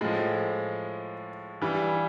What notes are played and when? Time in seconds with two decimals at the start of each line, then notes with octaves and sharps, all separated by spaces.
0.01 A2 F3 G#3
1.62 G2 E3 G3